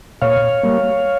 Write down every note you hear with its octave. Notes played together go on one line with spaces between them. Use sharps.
A#2 C#5 F5
G3 A#3